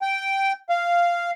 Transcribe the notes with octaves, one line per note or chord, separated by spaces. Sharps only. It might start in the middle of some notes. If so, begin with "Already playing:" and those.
G5
F5